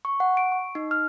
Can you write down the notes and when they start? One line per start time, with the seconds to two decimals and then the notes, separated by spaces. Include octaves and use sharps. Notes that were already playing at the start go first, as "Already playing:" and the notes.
0.05 C#6
0.20 F#5
0.37 D7
0.52 C#6
0.75 D#4
0.91 F6